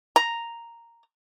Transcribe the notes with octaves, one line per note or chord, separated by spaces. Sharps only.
A#5